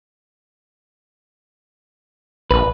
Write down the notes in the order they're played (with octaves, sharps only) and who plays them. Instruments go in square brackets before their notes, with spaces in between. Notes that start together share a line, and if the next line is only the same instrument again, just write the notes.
[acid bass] A#1 [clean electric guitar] B4